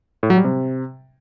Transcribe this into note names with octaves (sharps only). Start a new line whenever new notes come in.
A2
F#3
G3
C3